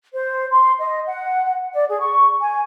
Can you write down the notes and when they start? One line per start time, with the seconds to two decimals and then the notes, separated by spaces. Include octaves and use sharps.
0.13 C5
0.51 C6
0.79 D#5
1.07 F#5
1.74 D5
1.89 G#4
2.01 C#6
2.41 G#5